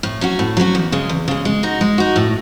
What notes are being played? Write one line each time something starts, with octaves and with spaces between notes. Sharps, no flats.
A2
F#3 C#4 F#4
A2
F#3 C#4 F#4
E2
C#3 G#3
E2
C#3 G#3
G#3
D#4 F#4
G#3
D#4 F#4
A2